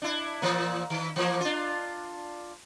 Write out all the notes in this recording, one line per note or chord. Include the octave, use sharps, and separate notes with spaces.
D4 E4
A#2 E3 A#3
D#3
E3 F3 A#3
D4 F4